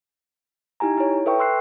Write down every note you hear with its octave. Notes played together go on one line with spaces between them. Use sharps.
D#4 E4 G4 G#5 A#5
E4 C#5
A4 B4 E5 G5 C#6
C6 E6 F#6 C7